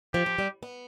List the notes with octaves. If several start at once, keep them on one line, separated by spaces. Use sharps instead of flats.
F3 G4
F3
G3
B3